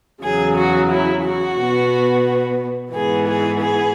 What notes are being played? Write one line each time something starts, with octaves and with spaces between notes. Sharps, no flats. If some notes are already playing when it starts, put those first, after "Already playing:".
E2 C#3 F#3 G#4
F#4
E4
F#4
B2 B3
G#2 E3 B3 G#4
G#4
G#4